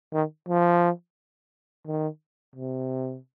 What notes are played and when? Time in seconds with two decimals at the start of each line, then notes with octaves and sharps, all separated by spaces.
0.13 D#3
0.48 F3
1.87 D#3
2.56 C3